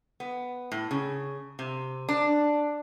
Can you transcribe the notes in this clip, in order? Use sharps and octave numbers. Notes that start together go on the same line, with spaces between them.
B3
A2
C#3
C3
D4